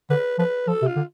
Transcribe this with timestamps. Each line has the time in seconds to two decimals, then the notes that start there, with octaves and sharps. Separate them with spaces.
0.10 D3 B4
0.38 F3 B4
0.67 F3 A4
0.82 C3
0.87 F4
0.96 D3